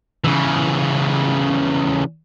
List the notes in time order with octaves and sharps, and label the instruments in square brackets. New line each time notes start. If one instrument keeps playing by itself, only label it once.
[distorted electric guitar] C#3 E3